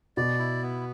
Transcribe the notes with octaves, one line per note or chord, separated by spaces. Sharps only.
B2 D5
E4
B3